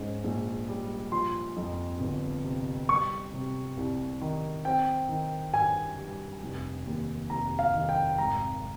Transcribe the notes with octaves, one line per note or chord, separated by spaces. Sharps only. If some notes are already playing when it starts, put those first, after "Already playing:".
Already playing: G#2 C#4
A#1
G3
F3 C6
F2
G1
C3
G3 C#6
C3
C2
D#3
C4 G5
D#3
G2 G#5
G3
F1
D#2
F1 A#5
F5
D#3
G5
G#1 A#5